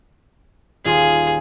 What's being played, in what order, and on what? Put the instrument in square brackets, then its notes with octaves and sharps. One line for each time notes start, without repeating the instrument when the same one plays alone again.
[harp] D#1 F4 C6 [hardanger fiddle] G#4